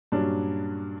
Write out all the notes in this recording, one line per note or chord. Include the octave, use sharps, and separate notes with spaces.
G2 A#2 F#3 C#4 D4